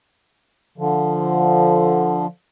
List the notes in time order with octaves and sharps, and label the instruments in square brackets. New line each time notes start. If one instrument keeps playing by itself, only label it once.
[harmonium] D3 F3